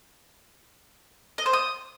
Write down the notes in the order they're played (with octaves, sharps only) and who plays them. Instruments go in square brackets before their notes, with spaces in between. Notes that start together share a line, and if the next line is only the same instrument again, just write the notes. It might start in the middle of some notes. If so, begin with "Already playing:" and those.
[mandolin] D#5
C5
D#6